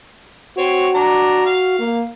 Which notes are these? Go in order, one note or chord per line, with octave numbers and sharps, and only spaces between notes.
C4 F#4 C#5
D4 A#5
F5
A#3